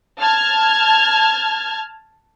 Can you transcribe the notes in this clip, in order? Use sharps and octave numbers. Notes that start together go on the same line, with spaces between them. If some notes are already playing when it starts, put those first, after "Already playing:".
A5 F6 G#6